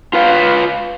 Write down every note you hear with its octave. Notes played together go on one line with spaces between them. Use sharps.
F4 B4 F5